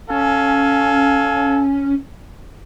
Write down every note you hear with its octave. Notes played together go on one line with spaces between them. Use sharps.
C#4 A4 F5 G#5